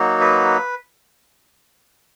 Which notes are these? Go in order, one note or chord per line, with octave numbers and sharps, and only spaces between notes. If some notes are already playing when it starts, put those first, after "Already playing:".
Already playing: F#3 A#3 D#4 F#4
B4